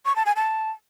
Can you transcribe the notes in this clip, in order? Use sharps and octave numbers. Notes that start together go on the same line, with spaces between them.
C#6
A5
G#5
A5